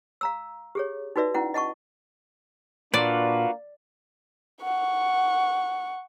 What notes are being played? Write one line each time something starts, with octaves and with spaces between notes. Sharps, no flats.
F5 A#5 E6
G4 G#4 C#5
D#4 F#4 B4 D5 E5
C#4 E4 F#5
D#5 F#5 A5 C#6
A#2 A#3 D4 F4 F#4 B4 D5 F5
F#5 C#6